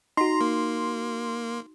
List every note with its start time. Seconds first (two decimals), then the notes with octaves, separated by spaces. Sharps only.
0.17 D#4 F#4 A#5 C6
0.41 A#3